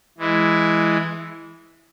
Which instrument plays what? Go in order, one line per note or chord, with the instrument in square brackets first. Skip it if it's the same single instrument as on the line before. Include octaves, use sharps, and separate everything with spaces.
[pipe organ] E3 G#3 E4